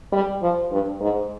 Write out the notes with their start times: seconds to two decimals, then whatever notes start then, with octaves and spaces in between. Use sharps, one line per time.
0.12 G3
0.42 F3
0.71 G2
1.01 G#2